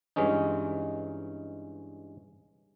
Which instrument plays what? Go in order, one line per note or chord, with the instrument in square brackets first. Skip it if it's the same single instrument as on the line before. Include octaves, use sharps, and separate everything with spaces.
[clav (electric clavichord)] G2 E3 G#3 C#4 D#4